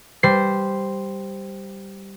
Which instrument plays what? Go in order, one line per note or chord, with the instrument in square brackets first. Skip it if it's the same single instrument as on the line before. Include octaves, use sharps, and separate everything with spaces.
[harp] G3 C5 C7